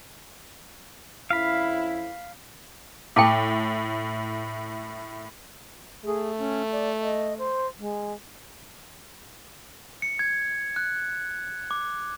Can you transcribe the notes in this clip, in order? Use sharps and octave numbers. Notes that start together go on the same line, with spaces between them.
F2 C#4 E4 F5 B5
A2 G5 A5 D6
A3 G#4
C#4
D5
D#5
C5
G#3
C#7
G#6
F#6
D6